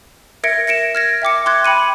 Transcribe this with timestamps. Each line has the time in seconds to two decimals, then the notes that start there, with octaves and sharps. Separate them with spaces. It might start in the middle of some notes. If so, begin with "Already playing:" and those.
0.44 A#4 E5 G#6 A#6 C#7 D7
0.67 A#6 C#7 D7 E7
0.95 F6 G#6 A#6
1.22 E5 G5 D6 C#7
1.46 C6 D6 F#6 G#6
1.65 G5 B5 C#7 D#7